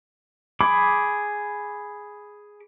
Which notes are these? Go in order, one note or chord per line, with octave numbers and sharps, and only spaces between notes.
G#4 B5 D6